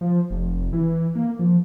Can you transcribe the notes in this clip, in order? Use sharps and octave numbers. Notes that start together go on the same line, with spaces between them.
F3
F1
E3
A#3
F3